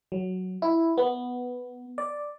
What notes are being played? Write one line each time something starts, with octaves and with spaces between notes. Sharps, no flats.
F#3
E4
B3
D5